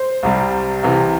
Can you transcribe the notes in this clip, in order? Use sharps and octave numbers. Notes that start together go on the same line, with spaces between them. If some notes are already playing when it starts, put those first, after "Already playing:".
Already playing: C5
C2 C3 G3
C2 C3 E3